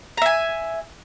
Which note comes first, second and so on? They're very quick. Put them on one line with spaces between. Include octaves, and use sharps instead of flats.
A#5 E5 G#5